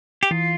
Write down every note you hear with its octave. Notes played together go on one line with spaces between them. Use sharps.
G4
E3 F4